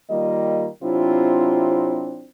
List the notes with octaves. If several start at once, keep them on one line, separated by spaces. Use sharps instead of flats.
D#3 G3 A#3 F4 D#5
C3 F#3 C4 D4 E4 F4